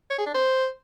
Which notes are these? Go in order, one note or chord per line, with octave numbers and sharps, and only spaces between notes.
C#5
G#4
D4
C5